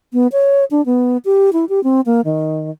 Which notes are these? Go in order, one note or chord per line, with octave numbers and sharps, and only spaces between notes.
B3
C#5
D4
B3
G4
E4
G4
C4
A#3
D#3